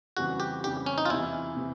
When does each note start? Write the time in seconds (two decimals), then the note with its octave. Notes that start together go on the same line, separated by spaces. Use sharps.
0.17 F2 C#3 E3 G3 F#4
0.40 G4
0.64 F2 C#3 E3 G3 G4
0.86 C#4
0.98 D#4
1.05 F4
1.10 E2 C3 E3 E4
1.57 C3 E3